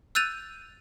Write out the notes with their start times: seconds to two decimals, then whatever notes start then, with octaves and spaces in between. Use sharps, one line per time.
0.15 E6 F#6 G6 A6 D#7 F7